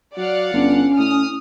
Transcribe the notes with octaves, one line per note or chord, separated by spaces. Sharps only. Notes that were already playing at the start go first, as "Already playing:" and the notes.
F#3 D5 F5 F#5
G1 C#4
A2 D#6 F6